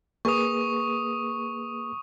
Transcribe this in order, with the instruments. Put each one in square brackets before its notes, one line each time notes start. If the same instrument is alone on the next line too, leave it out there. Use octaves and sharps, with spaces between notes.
[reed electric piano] A#3 G#4 B4 [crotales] C#6 D#6